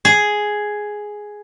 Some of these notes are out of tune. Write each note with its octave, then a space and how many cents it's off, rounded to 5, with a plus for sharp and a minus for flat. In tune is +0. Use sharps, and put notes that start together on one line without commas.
G#4 +5